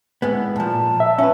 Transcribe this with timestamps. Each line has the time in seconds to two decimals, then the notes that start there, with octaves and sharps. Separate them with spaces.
0.22 A2 G#3 B3
0.56 A#2 F3 A5
1.00 E5
1.19 C#4 B4